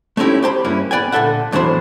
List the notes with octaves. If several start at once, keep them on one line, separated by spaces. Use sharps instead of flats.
A3 C4 C#4 D#4 E4 G4
G4 C5 A5 B5
G2 A#3 C#4 E4
B3 D5 G5 G#5
A#2 D3 A4 E5 F#5
E2 A2 F#3 D4 C5 B5